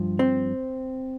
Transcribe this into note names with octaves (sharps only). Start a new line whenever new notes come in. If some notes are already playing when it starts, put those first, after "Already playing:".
Already playing: G2 F3
C4